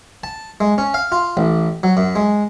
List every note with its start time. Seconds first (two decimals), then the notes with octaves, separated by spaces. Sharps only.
0.24 A5
0.61 G#3
0.78 C#4
0.94 F5
1.12 F4
1.37 A1
1.83 F#3
1.97 F#2
2.16 G#3